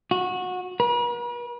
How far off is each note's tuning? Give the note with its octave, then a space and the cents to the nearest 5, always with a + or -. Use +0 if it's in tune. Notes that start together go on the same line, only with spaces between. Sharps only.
F#4 -20
B4 -45